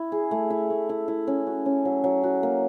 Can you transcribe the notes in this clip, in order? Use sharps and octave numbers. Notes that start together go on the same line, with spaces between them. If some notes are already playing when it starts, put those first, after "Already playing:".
Already playing: E4
G#4
A3
E4
A3
E4
E4
C#4
F#4
C#4
F#3
F#3
F#4
A#3